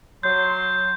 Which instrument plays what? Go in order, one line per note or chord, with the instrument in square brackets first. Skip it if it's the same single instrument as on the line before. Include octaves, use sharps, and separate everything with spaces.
[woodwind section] F#3 C6 [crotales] G6